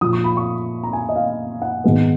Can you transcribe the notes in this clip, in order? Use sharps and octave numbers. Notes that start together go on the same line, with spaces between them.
A#2 F3 A#3 D#6
C#6
B5
C#6
A#5
G#5
D#5
F5
F#5
G#2 D#3 G#3 B3